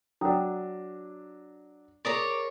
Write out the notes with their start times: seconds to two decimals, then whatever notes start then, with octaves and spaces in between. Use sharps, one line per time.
0.21 F#3 D4 G5 A#5 D#6
2.05 G#4 A#4 C#5 D5 A#5 D#6